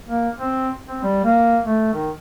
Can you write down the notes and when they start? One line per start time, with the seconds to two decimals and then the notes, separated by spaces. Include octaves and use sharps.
0.07 A#3
0.39 C4
0.87 C4
1.03 G3
1.24 A#3
1.64 A3
1.93 D#3